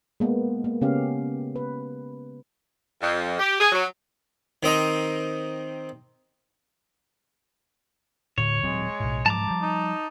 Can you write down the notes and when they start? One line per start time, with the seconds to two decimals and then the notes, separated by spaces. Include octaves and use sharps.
0.20 G#3 A#3 B3
0.64 A#3
0.81 C#3 B3 C#4 G4 F5
1.56 B4
3.02 F2
3.39 G4
3.60 G#4
3.72 F#3
4.63 D#3 C4 D#5 A#5
8.38 A2 D3 C#5
8.63 D#1 F#3 G#3 C4
9.00 B1 A2
9.26 G#2 F3 F#3 A5 A#5 D6
9.47 F3 G3
9.62 D#4